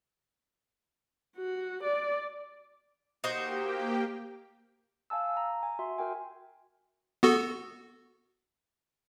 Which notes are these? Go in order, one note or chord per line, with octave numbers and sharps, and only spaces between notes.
F#4
D5
A#3 D#4 F#4 G4 C5 G5
F5 G#5 A5 E6
A#5
G#5
F#4 E5 C6
F#4 A#4 G5 G#5
B3 F#4 A4